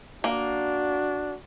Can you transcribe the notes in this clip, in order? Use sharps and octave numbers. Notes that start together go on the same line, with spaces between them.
A#3 D4 F#4